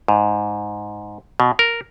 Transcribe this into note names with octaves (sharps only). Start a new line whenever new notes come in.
G#2
B2
A#4